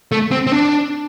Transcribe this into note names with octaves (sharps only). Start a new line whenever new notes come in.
A3
C4
C4
D4